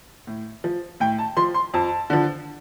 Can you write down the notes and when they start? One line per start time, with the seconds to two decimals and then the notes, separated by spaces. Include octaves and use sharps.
0.27 A2
0.64 F3
1.00 A2 G5
1.19 A5
1.37 F3 C6
1.54 C6
1.74 F2 A5
2.10 D3 F3